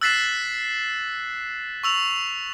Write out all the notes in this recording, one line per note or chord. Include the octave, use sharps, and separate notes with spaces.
E6 F#6 A6 B6 C7 E7
C#6 E6 F7